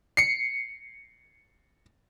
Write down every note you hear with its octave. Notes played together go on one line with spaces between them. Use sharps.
C7 C#7